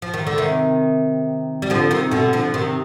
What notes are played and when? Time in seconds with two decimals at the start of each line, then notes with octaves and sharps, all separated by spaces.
0.02 F3
0.14 D#3
0.27 D3
0.38 C3 D#3
1.62 G3
1.70 D3 F3
1.91 C3 D#3
2.11 B2 D3
2.33 D3 F3
2.54 C3 D#3